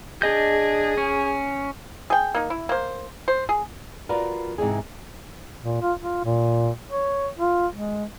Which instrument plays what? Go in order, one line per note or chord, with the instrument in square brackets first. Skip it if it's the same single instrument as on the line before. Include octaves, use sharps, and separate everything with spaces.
[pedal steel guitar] D4 D#5 G6 [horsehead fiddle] G#4
[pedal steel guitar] C#4
[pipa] G#4 G5
A#3 D#4
E4
A#3 C5
C5
G#4
[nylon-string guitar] F4 F#4 A#4 B4 D5 F5
G#2 C3 E3 G#4
[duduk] A#2
F4
F4
A#2
C#5
F4
G#3